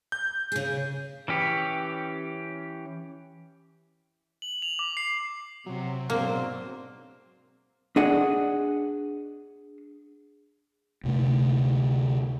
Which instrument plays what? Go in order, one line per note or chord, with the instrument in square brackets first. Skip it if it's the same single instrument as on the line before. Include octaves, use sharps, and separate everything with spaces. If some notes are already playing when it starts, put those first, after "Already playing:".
[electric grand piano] G6
[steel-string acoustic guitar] C#3 G#4
[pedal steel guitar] E3 C#4 G4 C#5
[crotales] F#7
F7
D6
C7
[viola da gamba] C3 [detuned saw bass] F#3
[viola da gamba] G#2 D4 C5 [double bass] B2 C4 [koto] A#3
[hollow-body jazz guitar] D4 G#4 D#5 F#5
[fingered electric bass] D2 C3 A3